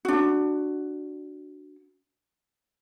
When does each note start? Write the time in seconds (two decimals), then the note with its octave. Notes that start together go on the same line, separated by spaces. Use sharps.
0.05 D4 F#4